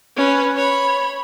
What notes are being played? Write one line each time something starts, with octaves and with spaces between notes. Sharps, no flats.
C#4 B4
C#5 B5